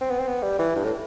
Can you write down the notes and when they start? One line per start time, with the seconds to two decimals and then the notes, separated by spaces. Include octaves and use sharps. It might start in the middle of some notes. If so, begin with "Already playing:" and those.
0.01 C4
0.10 B3
0.19 C4
0.27 B3
0.43 G3
0.59 E3
0.75 G2
0.84 A2